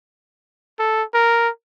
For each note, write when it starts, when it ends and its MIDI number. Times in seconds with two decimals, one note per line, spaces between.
0.79 1.03 69
1.14 1.49 70